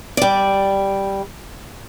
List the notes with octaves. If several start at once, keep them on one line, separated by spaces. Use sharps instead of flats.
G3 D5